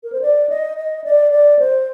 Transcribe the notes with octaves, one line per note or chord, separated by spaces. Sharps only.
A#4
C5
D5
D#5
D#5
D5
D5
C5